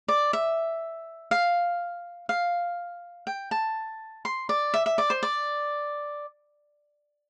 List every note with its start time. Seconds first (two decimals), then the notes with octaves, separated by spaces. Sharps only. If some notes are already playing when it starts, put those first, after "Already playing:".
0.08 D5
0.33 E5
1.31 F5
2.29 F5
3.27 G5
3.51 A5
4.25 C6
4.49 D5
4.74 E5
4.86 E5
4.98 D5
5.10 C5
5.23 D5